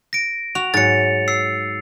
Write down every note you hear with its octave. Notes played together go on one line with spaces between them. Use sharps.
A#6 D7
F#4 F7
G#2 F#3 A6 C#7
E6 C7